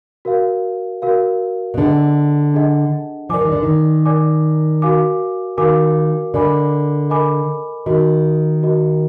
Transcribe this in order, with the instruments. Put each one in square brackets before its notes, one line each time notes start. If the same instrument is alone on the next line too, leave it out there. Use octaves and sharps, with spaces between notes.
[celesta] F#4 A#4 F5
F#4 A#4 F5
[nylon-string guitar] B2
[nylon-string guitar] D3 [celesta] D4 G#4 D#5 F#5
[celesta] D4 G#4 D#5 F#5
[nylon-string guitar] F3 [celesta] A#4 D5 G#5 D6
[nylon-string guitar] D#3
D3
D#3
[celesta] A#4 D5 G#5 D6
F#4 A#4 F5 G#5 D6
[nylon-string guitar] D#3 [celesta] F#4 A#4 F5 G#5 D6
[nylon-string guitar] D3 [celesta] A#4 D#5 G#5 B5 D6
[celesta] A#4 D#5 G#5 B5 D6
[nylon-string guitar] D#3 [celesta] F#4 A#4 D#5
[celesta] F#4 A#4 D#5